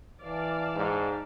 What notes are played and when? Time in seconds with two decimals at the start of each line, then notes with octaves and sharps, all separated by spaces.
0.21 E3 D5 F5 A5
0.75 G#2